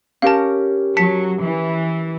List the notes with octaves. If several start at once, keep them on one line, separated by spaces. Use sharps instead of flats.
C#4 G4 A#4 F5 A5
F#3 A5 B6 C#7
E3